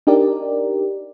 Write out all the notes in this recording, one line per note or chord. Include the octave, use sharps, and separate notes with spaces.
D4 D#4 G4 A#4 D5